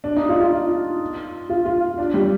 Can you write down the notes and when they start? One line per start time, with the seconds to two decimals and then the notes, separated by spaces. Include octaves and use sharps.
0.04 D4
0.16 D#4
0.29 F4
0.40 F4
1.49 F4
1.66 F4
1.98 D4
2.14 G3